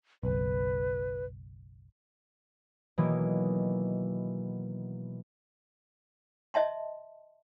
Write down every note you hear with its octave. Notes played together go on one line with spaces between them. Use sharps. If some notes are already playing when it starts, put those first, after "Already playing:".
F#1 B1 B4
B2 D#3 E3 F#3 A#3
D#5 E5 A5 C6